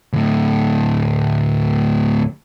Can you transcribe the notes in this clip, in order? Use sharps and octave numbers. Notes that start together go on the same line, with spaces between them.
D2 A2